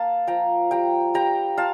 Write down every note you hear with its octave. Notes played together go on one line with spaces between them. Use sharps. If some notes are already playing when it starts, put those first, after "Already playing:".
Already playing: A#3 F5 A5
F3 G5 A#5
G3 G5 A#5
G3 G5 A#5
F4 F5 A5